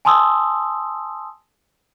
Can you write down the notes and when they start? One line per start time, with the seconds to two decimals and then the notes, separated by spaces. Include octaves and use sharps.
0.05 G#5 A5 C6 D#6 E6